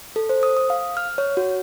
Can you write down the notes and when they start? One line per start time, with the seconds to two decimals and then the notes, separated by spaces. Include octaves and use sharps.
0.16 A4
0.29 C5
0.43 D#6
0.57 D#6
0.70 F5
0.97 F6
1.18 C#5
1.37 F#4